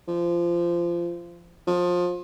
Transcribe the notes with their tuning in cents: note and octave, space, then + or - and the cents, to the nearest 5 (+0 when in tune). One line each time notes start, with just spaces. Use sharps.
F3 -20
F3 +25